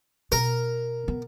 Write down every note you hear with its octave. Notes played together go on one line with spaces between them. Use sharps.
B2 A#4
B3